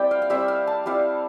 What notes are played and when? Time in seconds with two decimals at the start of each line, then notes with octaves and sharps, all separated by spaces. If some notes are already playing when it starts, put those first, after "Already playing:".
Already playing: G3 C4 E4 G5 D6
0.11 F5
0.22 F5
0.30 G3 C4 E4 E5
0.48 F5
0.67 A5
0.86 G3 C4 E4 F5